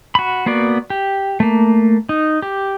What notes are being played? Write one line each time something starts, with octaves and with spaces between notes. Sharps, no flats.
F#4 B5
A#3 B3 F#4 D5
G4
A3 A#3
D#4
G4